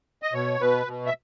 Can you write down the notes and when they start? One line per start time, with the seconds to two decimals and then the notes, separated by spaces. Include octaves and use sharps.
0.22 D#5
0.33 B2 C#5
0.60 B2 B4
0.86 B2
1.06 E5